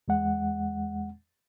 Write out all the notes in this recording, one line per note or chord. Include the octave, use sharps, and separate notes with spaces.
E2 G#3 F#5